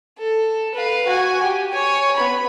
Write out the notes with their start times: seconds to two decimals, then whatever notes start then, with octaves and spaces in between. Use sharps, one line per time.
0.19 A4
0.74 B4 F5
1.07 F#4 G#5
1.42 G4
1.73 C#5 G#5
2.16 B3 B5